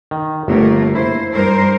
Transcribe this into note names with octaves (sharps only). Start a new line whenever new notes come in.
D#3
G1 A3 A#3 C#5
E4 C5
G2 A#4 C5